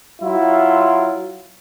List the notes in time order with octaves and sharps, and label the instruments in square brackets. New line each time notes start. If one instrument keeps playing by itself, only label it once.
[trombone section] F#3 E4 F4